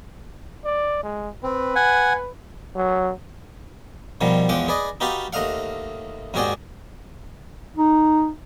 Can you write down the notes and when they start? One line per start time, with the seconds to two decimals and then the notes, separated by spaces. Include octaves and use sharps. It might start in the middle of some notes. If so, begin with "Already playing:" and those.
0.65 D5
1.03 G#3
1.43 C4 B4
1.75 F#5 G#5
2.75 F#3
4.21 B2 D#3 F3 G3
4.49 E2 F3 G#3 F#5 G5 D6
4.68 G#4 B4 D5 D#5
5.01 D#4 F#4 G4 B4 F5 A5
5.33 D#2 A3 D#5 F5 F#5
6.34 D#2 G#2 F#4 G#4 D5 G5
7.77 D#4